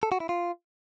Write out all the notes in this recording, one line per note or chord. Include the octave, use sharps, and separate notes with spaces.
A4
F#4
E4
F4